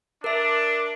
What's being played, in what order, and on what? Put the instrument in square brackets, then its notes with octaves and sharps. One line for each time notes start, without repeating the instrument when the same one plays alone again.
[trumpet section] D4 [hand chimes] A#4 E5